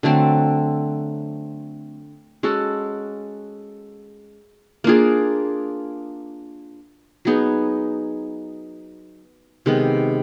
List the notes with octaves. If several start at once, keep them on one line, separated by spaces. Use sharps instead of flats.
D3 F#3 A3 C4
G#3 C#4 F#4 A4
A#3 D4 F4 G#4
F#3 B3 D#4 G#4
C3 D#3 G#3 B3